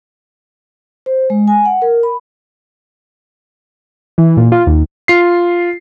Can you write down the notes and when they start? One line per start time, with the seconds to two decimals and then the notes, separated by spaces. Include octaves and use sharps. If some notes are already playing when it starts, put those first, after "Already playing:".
1.06 C5
1.30 G#3
1.48 G#5
1.65 F#5
1.82 A#4
2.03 B5
4.18 E3
4.37 A#2
4.52 F4
4.67 D#2
5.08 F4 C7